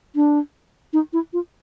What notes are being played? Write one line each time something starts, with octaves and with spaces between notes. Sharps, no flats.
D4
D#4
E4
F4